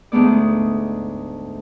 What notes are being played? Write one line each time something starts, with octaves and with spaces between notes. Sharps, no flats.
D2 G#2 A3 B3 D5